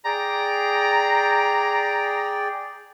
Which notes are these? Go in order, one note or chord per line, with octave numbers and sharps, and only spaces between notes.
G#4 D5 G5 A#5